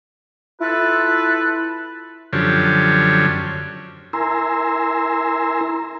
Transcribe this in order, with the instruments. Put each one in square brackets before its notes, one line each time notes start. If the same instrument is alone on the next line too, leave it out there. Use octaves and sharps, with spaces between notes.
[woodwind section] E4 F4 A4 B4
[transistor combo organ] F#2 D3 F3 G4 C#5
[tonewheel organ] E4 A#4 G#5 A#5 C6 E6